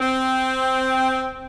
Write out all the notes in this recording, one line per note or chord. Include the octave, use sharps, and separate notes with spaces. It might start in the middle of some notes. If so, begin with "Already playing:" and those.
C4